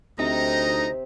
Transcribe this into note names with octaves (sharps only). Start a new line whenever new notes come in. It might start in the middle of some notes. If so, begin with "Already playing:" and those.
D2 C3 D#4 D#5 A#5